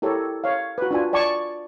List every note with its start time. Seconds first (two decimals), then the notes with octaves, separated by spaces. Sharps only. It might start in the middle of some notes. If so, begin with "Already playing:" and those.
0.02 E4 G4 A4 A#4 C#5
0.44 C#5 F5
0.78 F#4 B4
0.91 D4 F4 G#5
1.13 D5 G#5 A5 C#6